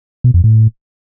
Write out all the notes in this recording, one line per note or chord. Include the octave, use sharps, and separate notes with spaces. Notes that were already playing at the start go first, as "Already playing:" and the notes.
B2
F2
A2